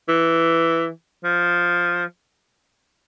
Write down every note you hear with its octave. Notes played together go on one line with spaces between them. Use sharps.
E3
F3